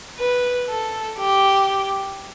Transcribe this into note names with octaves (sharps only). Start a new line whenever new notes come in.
B4
A4
G4